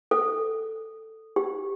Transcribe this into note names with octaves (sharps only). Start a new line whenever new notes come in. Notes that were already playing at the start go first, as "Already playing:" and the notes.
A4
G4